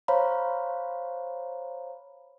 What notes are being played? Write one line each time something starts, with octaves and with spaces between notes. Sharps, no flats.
C5 C#5 F5 A#5 B5